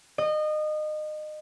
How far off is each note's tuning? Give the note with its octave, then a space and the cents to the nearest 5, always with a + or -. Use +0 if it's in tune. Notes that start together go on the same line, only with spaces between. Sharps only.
D#5 -25